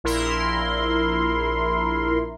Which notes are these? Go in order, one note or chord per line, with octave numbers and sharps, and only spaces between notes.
A#1 E4 A#4 C6